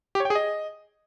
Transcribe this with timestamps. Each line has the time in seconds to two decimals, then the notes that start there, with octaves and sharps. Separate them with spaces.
0.15 G4
0.20 C#5
0.25 G5
0.30 G#4
0.35 D#5